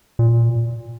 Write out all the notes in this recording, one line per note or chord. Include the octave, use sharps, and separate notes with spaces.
A#2